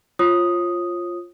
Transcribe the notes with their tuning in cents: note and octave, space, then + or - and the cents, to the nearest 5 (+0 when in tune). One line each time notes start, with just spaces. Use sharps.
F4 +0 C#5 -35 D#6 +0